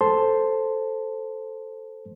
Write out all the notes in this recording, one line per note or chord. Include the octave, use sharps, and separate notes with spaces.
A4 C5 A5 C6